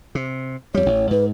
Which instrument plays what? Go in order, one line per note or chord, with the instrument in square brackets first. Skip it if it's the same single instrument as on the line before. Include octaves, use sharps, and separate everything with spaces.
[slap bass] C3
[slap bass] F2 G3 [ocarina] C#5
[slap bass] A1
[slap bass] G#2 [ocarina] B4